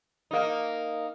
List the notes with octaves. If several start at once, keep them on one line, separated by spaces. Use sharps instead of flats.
A#3 D#4